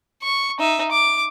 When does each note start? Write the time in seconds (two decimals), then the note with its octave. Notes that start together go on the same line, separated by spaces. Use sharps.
0.23 C#6
0.59 D#4 E5
0.92 D6